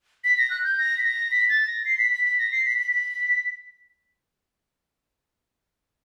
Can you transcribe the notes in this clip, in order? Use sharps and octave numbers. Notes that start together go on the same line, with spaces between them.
B6
A#6
F#6
G6
A#6
B6
A#6
B6
A6
A#6
C7
B6
B6
B6
A#6
C7
B6
B6
B6